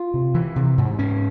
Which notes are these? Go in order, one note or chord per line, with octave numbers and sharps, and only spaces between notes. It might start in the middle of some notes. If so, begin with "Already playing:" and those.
Already playing: F4
C3
E3
C3
G#2
C#4